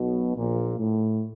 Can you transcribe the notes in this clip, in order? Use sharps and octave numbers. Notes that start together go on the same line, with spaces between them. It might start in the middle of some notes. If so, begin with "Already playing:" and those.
Already playing: B1 B2
A#1 A#2
A2